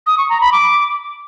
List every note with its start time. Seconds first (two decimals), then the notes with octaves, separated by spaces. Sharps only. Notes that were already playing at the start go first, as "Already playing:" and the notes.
0.07 D#6
0.18 C#6
0.29 A#5
0.41 B5
0.52 D6